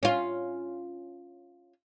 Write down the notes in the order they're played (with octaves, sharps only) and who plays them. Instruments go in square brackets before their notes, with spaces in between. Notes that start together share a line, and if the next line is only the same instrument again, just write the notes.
[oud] C#4 F4